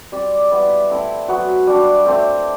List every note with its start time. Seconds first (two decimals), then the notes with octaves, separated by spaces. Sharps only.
0.12 G3 C4 G4 D5
0.51 G3 B3 E4
0.90 A3 C4 E4
1.28 F#3 B3 F#4
1.67 G3 D4 F#4
2.05 A3 C4 G4 C5